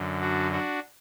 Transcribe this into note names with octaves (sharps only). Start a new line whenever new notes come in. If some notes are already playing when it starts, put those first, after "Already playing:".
Already playing: F#2 D3
D4 F#4
D4 F#4